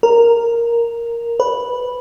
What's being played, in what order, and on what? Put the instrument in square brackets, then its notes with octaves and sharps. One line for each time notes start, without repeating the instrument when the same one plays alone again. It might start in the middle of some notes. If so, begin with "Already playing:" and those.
[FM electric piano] A#4
B4